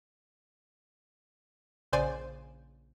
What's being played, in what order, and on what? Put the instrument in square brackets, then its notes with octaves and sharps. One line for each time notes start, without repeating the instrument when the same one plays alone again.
[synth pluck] A#1 C#3 C5 D5 G#5